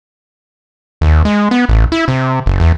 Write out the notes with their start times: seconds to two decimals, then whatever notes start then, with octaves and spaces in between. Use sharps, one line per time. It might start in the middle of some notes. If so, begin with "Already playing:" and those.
1.01 D#2
1.25 G#3
1.51 B3
1.69 A1
1.92 E4
2.08 C3
2.46 F#1
2.60 E2